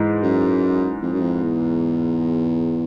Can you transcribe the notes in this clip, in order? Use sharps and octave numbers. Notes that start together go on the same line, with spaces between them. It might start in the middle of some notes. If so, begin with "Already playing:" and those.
Already playing: G#2 E3 G#3
F#2
F2
F#2
F2
E2